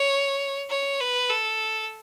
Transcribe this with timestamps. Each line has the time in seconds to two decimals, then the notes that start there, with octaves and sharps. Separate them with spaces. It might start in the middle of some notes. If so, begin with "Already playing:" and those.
Already playing: C#5
0.70 C#5
1.00 B4
1.30 A4